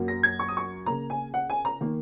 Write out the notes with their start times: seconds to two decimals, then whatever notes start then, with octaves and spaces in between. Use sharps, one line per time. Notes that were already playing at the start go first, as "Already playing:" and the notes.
Already playing: F#2 F#3 A#3
0.08 A#6
0.23 G#6
0.39 C#6
0.48 D#6
0.57 C#6
0.86 C#3 A#3 A#5
1.10 G#5
1.34 F#5
1.50 G#5
1.65 A#5
1.81 D#3 A#3